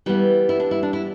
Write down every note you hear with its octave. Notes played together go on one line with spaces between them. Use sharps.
E3 G3 B3 E4
E4
D4
E4
D4
E4